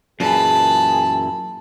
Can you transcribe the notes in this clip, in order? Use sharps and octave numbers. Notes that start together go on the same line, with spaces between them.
F#2 A#2 E3 G#4 A5 B5